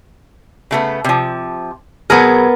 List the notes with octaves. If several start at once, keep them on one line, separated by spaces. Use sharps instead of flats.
C#3 A3 B3
C3 F3
B2 F#3 B3 G#4 A#4